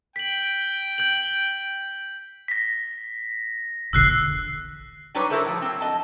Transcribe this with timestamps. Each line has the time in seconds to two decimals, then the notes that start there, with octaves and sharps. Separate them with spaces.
0.16 G5 B6 F#7
0.98 G6 F#7
2.48 A#6 B6
3.93 E1 A#1 D3 E6 F#6 C7
5.15 F#3 G3 D4 D#4 B4 C#5
5.30 E4 F#4 A4 A#4 C5
5.45 A2 F3
5.62 F#3 C4
5.81 D#5 A5